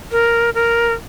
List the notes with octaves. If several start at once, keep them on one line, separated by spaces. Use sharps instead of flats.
A#4
A#4